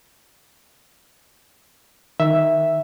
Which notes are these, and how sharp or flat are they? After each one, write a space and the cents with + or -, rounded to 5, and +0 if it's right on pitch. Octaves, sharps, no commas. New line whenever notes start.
D#3 +0 E5 +0